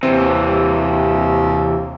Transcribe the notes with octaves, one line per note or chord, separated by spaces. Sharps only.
D#2 C3 E3 C4